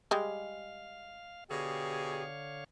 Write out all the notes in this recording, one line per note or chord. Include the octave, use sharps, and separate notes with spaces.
G3 G#3 F5
B2 D3 G4 G#4 C#5 F5